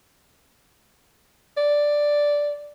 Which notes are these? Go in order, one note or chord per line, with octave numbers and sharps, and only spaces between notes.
D5